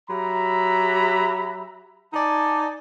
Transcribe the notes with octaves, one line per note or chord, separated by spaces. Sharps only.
F#3 G4 E5 A#5 B5
D#4 D5 G#5 A5